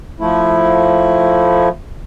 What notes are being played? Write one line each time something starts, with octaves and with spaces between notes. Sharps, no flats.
F3 A3 E4